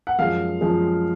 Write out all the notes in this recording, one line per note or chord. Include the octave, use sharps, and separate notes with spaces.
F#5
F#2 F3 G#3 F5
F#2 F3 G#3